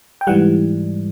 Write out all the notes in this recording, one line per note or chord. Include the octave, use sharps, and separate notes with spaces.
G5
G#2 E3 G3 F#5